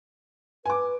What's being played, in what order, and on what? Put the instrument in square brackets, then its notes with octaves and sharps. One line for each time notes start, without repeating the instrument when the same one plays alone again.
[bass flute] B4 [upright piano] G#5 D6